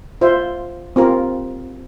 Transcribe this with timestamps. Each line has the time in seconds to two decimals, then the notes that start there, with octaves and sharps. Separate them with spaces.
0.21 F4 C5 E5
0.96 C4 F4 A#4